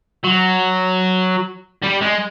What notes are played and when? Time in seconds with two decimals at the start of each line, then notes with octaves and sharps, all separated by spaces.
0.24 F#3
1.83 G3
2.02 G#3